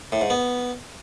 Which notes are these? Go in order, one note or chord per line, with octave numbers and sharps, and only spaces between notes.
A2
G#2
B3